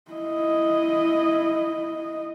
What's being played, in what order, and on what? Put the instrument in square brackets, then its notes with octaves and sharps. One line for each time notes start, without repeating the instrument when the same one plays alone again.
[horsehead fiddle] E4 D#5